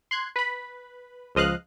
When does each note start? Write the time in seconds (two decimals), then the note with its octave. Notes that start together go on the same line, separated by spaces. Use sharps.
0.11 C6 F#6 G#6
0.36 B4 B5
1.35 C#2 F3 D#5 F5 F#6